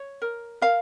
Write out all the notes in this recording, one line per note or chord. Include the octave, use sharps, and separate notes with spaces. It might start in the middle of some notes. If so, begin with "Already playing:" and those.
Already playing: C#5
A#4
A#4 F5